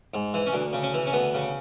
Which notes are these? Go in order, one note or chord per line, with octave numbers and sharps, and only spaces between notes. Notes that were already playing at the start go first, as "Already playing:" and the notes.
G#2
E3
C#4
D2 D4
C#3
C#4
E3
C#4
D2 B3
C#3